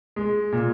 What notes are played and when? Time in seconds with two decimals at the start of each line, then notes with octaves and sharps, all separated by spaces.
0.16 G#3
0.52 A#2